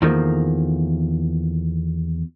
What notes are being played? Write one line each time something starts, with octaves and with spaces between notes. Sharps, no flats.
E2 D#3 F3 A3 A#3